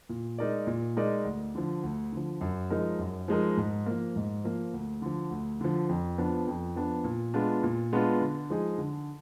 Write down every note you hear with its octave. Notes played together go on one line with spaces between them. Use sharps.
A#2
G#3 D#4 A#4 D5
A#2
G#3 D#4 A#4 D5
D2
D3 F3
D2
D3 F3
F#2
F3 G#3 D#4 A#4
F#2
F3 G#3 D#4 A#4
G#2
F3 A#3
G#2
F3 A#3
D2
D3 F3
D2
D3 F3
F2
F3 B3 D4
F2
F3 B3 D4
A#2
G#3 B3 D4 F4
A#2
G#3 B3 D4 F4
D3
F3 G#3 D#4 G#4
D3